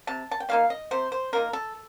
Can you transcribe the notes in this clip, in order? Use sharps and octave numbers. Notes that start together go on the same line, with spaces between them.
C3 A5
A5
G5
F3 A#3 D#4 F5
D#5
C3 C5
C5
F3 A#3 D#4 A#4
A4